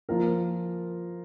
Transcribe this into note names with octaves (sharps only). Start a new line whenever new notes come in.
F3 A#3 F4 A#4